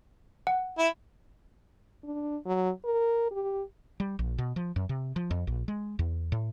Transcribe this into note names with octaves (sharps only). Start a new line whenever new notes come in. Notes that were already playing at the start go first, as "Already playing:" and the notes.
F#5
E4
D4
F#3
A#4
G4
G3
A#1
B2
F3
F#2
C3
F3
F2
A#1
G#3
E2
A2